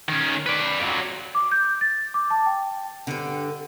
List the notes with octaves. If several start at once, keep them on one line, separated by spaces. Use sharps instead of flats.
D#3 C#4
B4 D5
F2 F#3
D6
G6
A6
D6
A5
G5
G2 D3